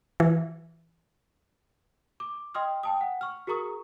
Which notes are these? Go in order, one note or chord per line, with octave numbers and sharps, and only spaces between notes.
E3
D6
D#5 G5 C6 D#6 F6
G5 A5 D#6
F#5
C#6 F6
F#4 G#4 A#4 A#5 C#6 D#6